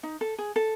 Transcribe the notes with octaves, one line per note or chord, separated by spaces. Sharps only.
D#4
A4
G#4
A4